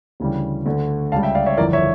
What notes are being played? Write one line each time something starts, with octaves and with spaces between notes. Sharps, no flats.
D2 C#3 E3 G3
D2 D3 A3
C#2 C#3 G3 F5 A5
E5 G5
D5 F5
C#5 E5
G1 F2 E3 A#4 D5
C#5 E5